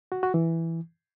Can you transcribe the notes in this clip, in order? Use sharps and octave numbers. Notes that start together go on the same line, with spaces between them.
F#4
F#4
E3